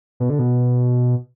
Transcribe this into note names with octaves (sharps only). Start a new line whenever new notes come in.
B2
D3
B2